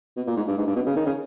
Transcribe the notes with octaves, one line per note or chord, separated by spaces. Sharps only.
B2
A#2
G#2
G2
G#2
G2
B2
C#3
D#3
C#3